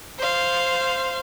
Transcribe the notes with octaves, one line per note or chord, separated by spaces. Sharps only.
C5 F5